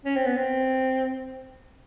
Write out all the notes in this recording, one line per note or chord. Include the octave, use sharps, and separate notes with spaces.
C#4
C4
B3
C4